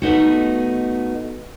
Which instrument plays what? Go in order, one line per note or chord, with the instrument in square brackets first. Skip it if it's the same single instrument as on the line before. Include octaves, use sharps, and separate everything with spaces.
[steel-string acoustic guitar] A3 B3 D#4 F#4